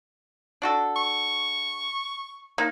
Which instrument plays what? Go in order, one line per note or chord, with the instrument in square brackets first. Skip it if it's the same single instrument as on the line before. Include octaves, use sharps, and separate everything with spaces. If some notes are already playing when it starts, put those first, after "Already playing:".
[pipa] D4 F#4 A4
[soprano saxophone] C#6
[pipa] A#3 D#4